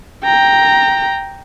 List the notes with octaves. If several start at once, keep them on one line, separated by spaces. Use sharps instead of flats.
G5 A#5